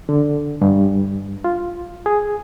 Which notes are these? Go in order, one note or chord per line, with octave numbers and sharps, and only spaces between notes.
D3
G2
F4
G#4